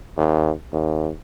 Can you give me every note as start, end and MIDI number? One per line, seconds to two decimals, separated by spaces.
0.17 0.51 39
0.73 1.11 39